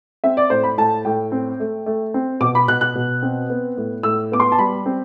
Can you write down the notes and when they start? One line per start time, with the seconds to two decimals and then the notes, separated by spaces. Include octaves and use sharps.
0.24 C4 E5
0.37 D5
0.50 A2 C5
0.63 B5
0.77 A2 A5
1.05 A2 G5
1.32 C4
1.60 A3
1.86 A3
2.14 C4
2.40 B2 D6
2.55 B5
2.68 B2 F#6
2.81 F#6
2.95 B2
3.22 C4
3.50 B3
3.77 A2
4.03 A2 E6
4.32 B3 D6
4.40 C6
4.52 A5
4.58 G3 B5
4.86 C4